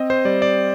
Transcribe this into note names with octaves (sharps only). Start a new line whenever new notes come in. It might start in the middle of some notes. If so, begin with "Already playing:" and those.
Already playing: C4 D#5
C5
G3 D5
D5